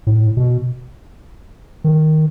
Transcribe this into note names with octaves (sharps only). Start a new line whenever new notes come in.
A2
B2
D#3